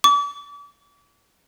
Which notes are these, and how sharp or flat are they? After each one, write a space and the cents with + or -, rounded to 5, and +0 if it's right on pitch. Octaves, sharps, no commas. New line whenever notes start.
D6 -40